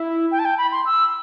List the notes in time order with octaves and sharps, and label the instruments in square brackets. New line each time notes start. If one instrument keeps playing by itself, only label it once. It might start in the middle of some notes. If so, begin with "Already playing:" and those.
Already playing: [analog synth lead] E4
[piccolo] G5
A5
G5
B5
C6
E6